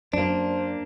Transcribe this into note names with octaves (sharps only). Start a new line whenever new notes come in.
F#2 A#3 D4 C5